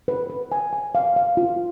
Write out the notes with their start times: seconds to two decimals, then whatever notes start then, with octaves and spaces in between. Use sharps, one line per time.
0.08 B4
0.30 B4
0.52 G#5
0.73 G#5
0.95 F5
1.16 F5
1.37 F4